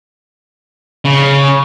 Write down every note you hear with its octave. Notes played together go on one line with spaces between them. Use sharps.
C#3